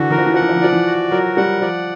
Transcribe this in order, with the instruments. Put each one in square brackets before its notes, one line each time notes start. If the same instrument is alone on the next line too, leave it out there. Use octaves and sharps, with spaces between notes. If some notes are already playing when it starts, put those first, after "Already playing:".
Already playing: [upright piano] D3 E3 [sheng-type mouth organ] F#4
[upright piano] E3 [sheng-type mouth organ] A#4
[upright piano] F3
E3
[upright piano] F3 [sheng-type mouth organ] F#5
[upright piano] E3
F3
E3
[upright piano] F3 [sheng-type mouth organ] D5
[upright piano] E3
[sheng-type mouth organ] F#4
[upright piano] F#3 [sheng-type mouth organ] A#4
[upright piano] G3 [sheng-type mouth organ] F#5
[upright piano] F3 [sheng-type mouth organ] D5